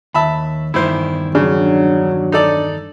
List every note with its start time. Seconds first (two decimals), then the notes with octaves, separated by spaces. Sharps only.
0.14 D#2 E5 A5 B5
0.74 E2 G2 D#3 E4 C5
1.35 C#3 F#3 D4
2.32 D#4 A4 D5